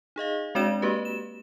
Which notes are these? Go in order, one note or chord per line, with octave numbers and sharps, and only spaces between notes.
D#4 G#4 D#5 F5
G#3 C4 D4 F#4 D5 E7
A#3 F#4 G4 B4
E7